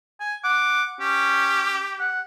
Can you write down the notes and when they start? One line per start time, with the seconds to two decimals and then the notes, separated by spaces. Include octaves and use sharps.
0.20 G#5
0.44 F#5 D6
1.01 C#4 G4
2.00 F#5